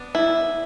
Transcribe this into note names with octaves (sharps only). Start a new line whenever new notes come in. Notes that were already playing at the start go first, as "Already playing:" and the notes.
Already playing: B3 D4
E4